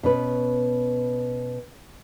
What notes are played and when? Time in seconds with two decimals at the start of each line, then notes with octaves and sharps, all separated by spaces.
0.03 B2 C#4 B4